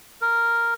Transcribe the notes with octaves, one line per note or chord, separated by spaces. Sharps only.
A#4